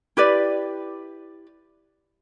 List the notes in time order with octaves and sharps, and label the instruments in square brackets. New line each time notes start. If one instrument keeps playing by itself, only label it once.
[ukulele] E4 G4 B4 D5